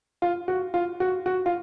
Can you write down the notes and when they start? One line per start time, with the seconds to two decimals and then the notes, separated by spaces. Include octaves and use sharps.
0.22 F4
0.48 F#4
0.74 F4
1.00 F#4
1.26 F#4
1.46 F4